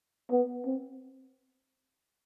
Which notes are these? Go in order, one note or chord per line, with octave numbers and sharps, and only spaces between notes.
B3
C4